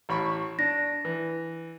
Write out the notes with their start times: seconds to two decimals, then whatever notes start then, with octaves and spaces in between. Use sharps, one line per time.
0.09 A1 B5 C#6
0.59 D4 A#6
1.05 E3